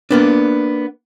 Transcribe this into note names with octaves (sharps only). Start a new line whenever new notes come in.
A#3 B3 D4